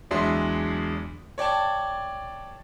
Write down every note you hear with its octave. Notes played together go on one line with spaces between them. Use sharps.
E2 F#3 G#3 D4 E5 C6
C#5 D5 G5 A5